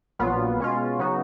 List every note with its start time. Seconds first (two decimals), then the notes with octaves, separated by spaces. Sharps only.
0.19 A#1 A#2 F#3 B3 F4
0.60 B2 G#3 C#4 F4
0.99 C#3 F#3 B3 D#4 F#4